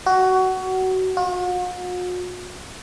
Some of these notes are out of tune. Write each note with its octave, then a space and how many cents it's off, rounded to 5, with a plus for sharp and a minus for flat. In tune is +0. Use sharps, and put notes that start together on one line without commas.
F#4 +20
F#4 -45